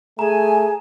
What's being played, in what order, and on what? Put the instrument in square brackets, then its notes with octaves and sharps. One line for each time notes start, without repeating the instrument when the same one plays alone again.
[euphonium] A3 [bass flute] G#4 [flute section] G#5 [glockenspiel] A#5